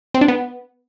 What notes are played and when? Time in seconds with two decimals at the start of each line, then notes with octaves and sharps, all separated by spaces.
0.14 C4
0.21 D4
0.28 B3